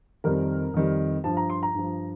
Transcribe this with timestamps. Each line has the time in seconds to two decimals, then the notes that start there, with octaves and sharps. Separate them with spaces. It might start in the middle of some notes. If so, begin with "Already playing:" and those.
0.24 F2 D#3 G3 A#4
0.74 F2 D#3 G3
1.24 G2 F3 A5
1.37 A#5
1.50 C6
1.63 A#5
1.74 G2 F3